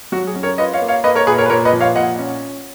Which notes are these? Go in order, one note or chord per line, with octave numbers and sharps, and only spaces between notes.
F#3 F#4
G#4
C#4
A#4 C#5
F4 B4 D#5
C#5 F5
A#3
C#5 F5
A#3 B4 D#5
A#4 C#5
A#2 G#4 B4
A#4 C#5
B4
A#2 A#4 C#5
B4 D#5
F3
C#5 F5
A#2 D#5 F#5
C#4